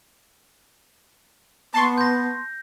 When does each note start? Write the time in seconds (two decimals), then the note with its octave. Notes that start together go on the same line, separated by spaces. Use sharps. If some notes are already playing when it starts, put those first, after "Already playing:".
1.74 B3 A5 C6 C#6
1.98 G6 A#6